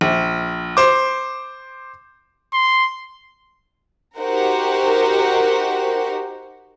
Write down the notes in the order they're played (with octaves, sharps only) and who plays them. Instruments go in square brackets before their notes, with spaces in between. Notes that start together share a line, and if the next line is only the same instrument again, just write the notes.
[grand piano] A#1
C5 D6
[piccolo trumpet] C6
[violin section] D#4 F#4 G4 A#4 C5 F#5